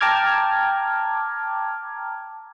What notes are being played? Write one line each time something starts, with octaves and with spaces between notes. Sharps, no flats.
G5 A5 A#5 D6 F6 G#6